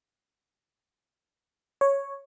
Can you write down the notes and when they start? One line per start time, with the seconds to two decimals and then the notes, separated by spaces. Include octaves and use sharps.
1.81 C#5